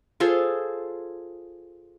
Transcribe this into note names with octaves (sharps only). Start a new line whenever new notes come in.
F4 G#4 A4 C5